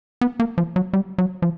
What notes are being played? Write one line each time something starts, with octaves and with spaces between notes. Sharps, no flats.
B3
A#3
F3
F#3
G3
F#3
F3